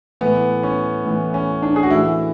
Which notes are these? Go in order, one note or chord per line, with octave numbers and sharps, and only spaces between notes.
A2 E3 B3
C#4
A2 E3
C#4
D4
G#4
F#4
A2 E3 E4